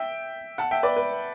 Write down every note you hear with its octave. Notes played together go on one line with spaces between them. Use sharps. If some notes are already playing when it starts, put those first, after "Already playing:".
Already playing: E5 G5
F#5 A5
E5 G5
B4 D5
B4